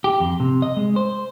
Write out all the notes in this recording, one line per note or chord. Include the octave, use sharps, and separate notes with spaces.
G4
F2
C3
D#5
G#3
C5